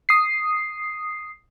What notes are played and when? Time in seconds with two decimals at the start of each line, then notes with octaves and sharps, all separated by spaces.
0.09 D#6 C7